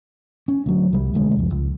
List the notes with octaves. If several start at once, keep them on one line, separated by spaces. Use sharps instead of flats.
C#4
D2 F#3
C2 G3
E1 D2 G#3
C2 F2
C#2